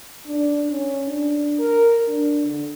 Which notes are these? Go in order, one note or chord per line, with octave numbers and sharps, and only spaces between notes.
D4
C#4
D4
A#4
D4
D3